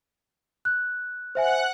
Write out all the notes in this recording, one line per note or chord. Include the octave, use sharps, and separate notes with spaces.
F#6
C5 E5 F#5 G#5 F#6